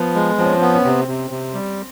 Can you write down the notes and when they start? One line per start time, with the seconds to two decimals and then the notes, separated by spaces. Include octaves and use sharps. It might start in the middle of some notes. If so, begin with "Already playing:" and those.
Already playing: F3 B3
0.15 G#3
0.38 F3 C4
0.45 C#4
0.52 C4
0.61 B3
0.75 C#4
0.84 C3 C4
1.07 C3
1.30 C3
1.54 G3